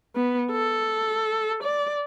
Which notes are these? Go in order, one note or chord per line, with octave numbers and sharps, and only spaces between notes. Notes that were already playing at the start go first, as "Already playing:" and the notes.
B3
A4
D5